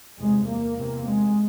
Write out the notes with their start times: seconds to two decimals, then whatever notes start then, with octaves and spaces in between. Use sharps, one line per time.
0.18 E2 C3 G#3
0.47 A#3
0.77 E2 C3
1.07 G#3